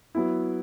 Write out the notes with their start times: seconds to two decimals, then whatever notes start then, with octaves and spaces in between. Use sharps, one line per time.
0.15 F#3 B3 E4